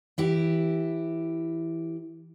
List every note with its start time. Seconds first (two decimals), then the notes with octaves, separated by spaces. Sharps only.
0.18 E3 E4 G4